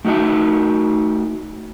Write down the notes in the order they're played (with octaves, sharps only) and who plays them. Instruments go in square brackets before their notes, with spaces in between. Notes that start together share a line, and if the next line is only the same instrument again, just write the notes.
[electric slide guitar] A3 D#4 F#4 E5 A5